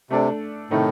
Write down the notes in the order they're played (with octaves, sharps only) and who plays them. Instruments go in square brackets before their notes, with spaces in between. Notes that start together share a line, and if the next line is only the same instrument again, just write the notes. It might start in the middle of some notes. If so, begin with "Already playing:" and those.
[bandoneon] C3 [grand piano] A3 D4 A4 D5
[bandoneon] A2 [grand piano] C3 D#3 A3 D#4